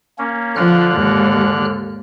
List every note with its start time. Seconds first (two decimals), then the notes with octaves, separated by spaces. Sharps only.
0.18 A#3 C#4
0.56 D3 F3 F6 F#6
0.95 D#2 G#2